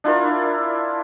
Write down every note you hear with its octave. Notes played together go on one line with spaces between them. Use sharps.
D4 E4 F4 A#4